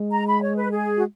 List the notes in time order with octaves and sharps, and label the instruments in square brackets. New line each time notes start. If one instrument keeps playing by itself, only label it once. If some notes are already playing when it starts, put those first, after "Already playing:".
Already playing: [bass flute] G#3
[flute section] A#5
B5
C#5
B4
G#4
F#4